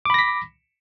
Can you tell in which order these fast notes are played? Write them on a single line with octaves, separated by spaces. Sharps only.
D6 B5 A#6 B6